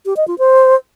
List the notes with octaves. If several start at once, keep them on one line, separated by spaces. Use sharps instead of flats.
G4
D#5
F4
C5